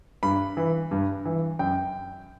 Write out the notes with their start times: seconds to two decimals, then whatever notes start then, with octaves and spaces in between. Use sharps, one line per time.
0.23 G2 B5
0.57 E3
0.91 G2
1.25 E3
1.59 F#2 G5